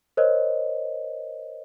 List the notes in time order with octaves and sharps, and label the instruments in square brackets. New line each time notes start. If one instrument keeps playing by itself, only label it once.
[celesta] A#4 C5 C#5 D#5